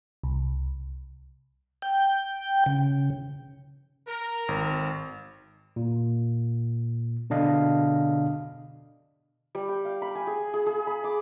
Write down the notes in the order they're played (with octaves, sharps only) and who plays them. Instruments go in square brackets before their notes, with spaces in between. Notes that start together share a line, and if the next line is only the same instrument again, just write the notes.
[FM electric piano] C2
[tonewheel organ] G5
C#3
[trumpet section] A#4
[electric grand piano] G#1
[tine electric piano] A#2
B2 D3 D4 D#5 F5
[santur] G3
G5
F5
B5
G#5
G#4
G#4
G#4
B5
D6